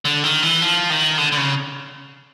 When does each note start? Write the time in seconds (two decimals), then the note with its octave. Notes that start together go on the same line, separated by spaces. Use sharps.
0.05 D3
0.24 D#3
0.42 E3
0.62 F3
0.90 D#3
1.18 D3
1.32 D3
1.37 C#3